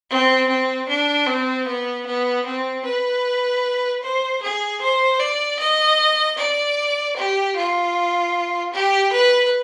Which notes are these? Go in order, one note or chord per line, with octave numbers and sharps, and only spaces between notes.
C4
C4
D4
C4
B3
B3
C4
B4
C5
G#4
C5
D5
D#5
D5
G4
F4
G4
B4